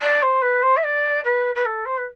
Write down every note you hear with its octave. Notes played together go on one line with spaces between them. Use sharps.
D5
C5
B4
C5
E5
D5
B4
B4
A4
C5
B4